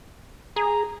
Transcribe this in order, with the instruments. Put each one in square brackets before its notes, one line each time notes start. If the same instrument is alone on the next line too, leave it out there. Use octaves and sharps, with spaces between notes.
[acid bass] G#4 [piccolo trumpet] A#5